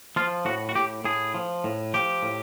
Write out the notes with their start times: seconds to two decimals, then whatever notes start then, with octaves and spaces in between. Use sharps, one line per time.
0.16 F3 F4
0.45 A2 F#4
0.69 F#4
0.75 A2 G4
1.05 A2 G#4
1.34 F3
1.64 A2
1.94 F3 G4
2.23 A2